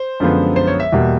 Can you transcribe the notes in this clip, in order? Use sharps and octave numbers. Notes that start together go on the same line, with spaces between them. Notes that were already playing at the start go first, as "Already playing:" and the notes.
Already playing: C5
F#2 D3 F3 G#3 B3
C5
C#5
E5
E2 B2 G3 A#3